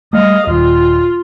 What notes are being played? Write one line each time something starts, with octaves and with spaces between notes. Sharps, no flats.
G3 A3 D#5 F5
D#1 F4